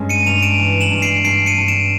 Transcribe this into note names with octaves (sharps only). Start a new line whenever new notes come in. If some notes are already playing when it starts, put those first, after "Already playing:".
Already playing: G2 G#3 C#4
C#7 D#7
G2 D#7 F7
D7 E7
E3
E7 F#7
G2
C7 D7
G2 C7 D7
C#7 D#7
G2
D7 E7